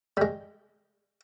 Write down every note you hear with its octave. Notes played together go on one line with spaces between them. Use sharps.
G3 G#3